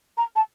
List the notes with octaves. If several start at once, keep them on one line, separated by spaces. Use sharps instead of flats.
A#5
A5